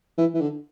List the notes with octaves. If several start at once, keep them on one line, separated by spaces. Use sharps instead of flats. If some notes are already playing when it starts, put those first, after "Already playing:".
E3
E3
D3